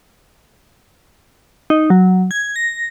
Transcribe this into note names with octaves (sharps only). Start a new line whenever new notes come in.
D#4
F#3
G#6
A#6